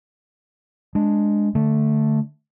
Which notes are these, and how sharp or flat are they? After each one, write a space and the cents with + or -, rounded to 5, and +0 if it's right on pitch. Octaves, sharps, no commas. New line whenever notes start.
G#3 +0 D4 +0
D3 +0 A3 +0